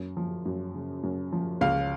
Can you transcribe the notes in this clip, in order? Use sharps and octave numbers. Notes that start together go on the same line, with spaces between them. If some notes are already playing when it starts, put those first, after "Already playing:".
Already playing: F#2
F3
F#2
C#3
F#2
F3
C#2 F5